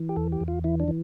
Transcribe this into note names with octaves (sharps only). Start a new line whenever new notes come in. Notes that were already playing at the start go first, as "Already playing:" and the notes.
Already playing: E3
G4
E2 A4
G4
E2
F4
E3 E4
D4
E3